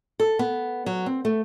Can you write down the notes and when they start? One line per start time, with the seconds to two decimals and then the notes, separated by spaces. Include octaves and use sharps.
0.20 A4
0.39 B3
0.86 F#3
1.06 C4
1.25 A3